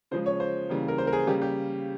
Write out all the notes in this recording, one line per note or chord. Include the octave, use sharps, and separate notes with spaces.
C#3 F3 G#3 C5
C#5
C5
C#3 E3 G3 A#3
A#4
C5
A#4
G#4
C#3 G3 A#3 G4
G4